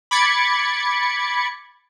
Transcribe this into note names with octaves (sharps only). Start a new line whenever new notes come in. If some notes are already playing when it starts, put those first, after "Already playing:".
B5 D6 G#6 A6 C#7